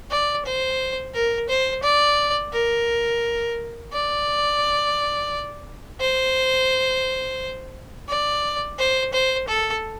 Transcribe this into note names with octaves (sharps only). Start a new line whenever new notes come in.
D5
C5
A#4
C5
D5
A#4
D5
C5
D5
C5
C5
A4